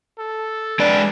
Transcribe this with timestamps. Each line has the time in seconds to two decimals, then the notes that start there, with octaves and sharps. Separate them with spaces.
0.19 A4
0.79 G#3 D4 B4 D5